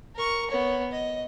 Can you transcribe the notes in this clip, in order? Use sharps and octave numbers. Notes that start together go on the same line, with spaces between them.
A#4 C#6
B3 C#5
D#5